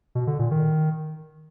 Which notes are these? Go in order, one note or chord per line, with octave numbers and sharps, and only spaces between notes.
B2
D3
A#2
D#3